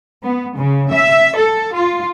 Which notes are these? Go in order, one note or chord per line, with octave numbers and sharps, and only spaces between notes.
B3
C#3
E5
A4
F4